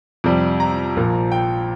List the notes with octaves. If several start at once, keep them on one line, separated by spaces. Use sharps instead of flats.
F2 C3 G3
A#5
A#1 A#2 F3
G5